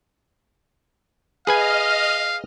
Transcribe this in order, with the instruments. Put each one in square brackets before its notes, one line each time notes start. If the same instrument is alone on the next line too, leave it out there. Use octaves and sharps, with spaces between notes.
[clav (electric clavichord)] G#4 B4 G#5 [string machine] D#5 F6 [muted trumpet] F5